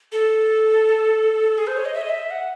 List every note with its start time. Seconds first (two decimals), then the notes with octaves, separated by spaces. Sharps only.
0.12 A4
1.58 G#4
1.67 C5
1.77 C#5
1.85 D#5
1.94 E5
2.01 D#5
2.09 E5
2.31 F#5